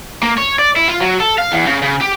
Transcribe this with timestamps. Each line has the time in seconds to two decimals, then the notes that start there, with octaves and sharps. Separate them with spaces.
0.23 A#3
0.38 C#5
0.59 D5
0.76 E4
0.88 F4
1.00 F#3
1.20 A4
1.38 F5
1.52 E2
1.67 C#3
1.82 C#3
2.01 G4